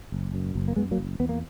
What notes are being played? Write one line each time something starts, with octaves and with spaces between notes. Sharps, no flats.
F#1
F#2
F#1
A#3
F#2 G#3 B3
F#3 A#3
F#1
E2 B3
A#3